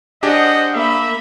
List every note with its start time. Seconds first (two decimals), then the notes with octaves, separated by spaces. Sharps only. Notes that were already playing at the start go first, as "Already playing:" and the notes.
0.23 D4 G4 G#4 C5 D#5 F#5
0.74 A#3 E5 B5